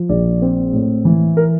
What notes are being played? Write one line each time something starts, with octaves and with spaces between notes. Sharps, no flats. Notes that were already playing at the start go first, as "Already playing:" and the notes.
Already playing: F3
A#1 D5
C4
A2
E3
A#4